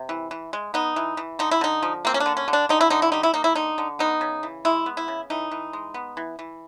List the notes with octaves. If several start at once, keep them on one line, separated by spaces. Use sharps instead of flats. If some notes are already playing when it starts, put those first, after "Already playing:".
Already playing: C3
E3
E3
G#3
B3 D#4
E3
E3
D3 D#4
E4
D3 D#4
F3
A#3 C4
C#4
D4
D3
C#4
D3
D4
D3 D#4
E4
D3 D#4
E4
G3 D#4
E4
A#3 D#4
E4
D3 D#4
D3
B3 D#4
C#3
E3
G#3 E4
B3
E4
C#3
E3 D#4
E3
G#3
B3
E3
E3